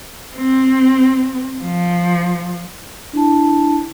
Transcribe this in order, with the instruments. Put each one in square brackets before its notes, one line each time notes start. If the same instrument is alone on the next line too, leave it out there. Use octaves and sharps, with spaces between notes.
[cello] C4
F3
[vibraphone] D4 E4 A5